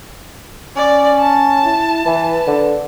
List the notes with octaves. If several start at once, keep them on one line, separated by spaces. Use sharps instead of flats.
C#4 D5
A5
E4
E3 B4
D3